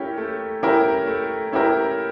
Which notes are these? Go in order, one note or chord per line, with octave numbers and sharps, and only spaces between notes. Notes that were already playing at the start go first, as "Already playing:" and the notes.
Already playing: A3 C#4 E4 G4 A#4
A3
C#4 E4 G4 A#4
A3
C#4 E4 G4 A#4